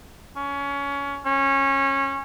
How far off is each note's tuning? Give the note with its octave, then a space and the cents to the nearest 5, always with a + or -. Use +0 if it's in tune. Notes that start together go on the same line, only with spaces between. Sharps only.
C#4 +20
C#4 -20